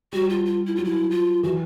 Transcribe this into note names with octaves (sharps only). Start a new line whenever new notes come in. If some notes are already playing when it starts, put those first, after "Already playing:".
G3 F#4
F4
F4
E4
F#3 F4
E4
F4
E3 F#4